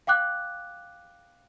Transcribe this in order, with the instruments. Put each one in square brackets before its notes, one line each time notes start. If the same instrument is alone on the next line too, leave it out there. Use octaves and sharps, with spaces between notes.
[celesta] F5 G5 D6 F#6